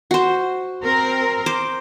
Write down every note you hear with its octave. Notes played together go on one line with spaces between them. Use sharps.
F#4 C5
C4 A#4
C5 D6